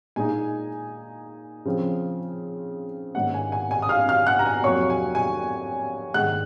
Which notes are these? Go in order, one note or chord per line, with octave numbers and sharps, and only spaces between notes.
A#2 G#3 D#4 G#5
C#3 F3 C4
G#2 D#3 A#3 C#4 F#5
G#5
G#5
G#5
D#6
F5 F6
F5 F6
F#5 F#6
A#5
G#5
F2 C3 F#3 A#3 C#5 C#6
G#5
G#5
G#2 D#3 G#3 F#5 F#6